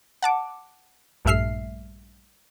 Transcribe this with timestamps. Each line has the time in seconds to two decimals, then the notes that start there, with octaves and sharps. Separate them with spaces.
0.22 F#5 A5 D6
1.25 A#1 G2 A3 E5 F6 C7